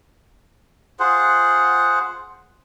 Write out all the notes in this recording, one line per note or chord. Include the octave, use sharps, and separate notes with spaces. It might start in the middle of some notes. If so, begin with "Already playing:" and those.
F4 G#4 C5 F#5